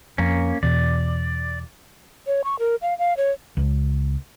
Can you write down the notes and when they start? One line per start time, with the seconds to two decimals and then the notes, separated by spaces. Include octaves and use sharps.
0.18 F2 A#3 C#4
0.63 E2 B2 D5
2.27 C#5
2.44 C#6
2.59 A#4
2.82 F5
2.99 F5
3.17 C#5
3.57 C#2